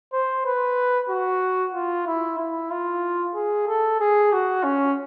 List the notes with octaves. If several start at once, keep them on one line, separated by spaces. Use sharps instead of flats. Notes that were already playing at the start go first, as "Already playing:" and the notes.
C5
B4
F#4
F4
E4
E4
F4
G#4
A4
G#4
F#4
C#4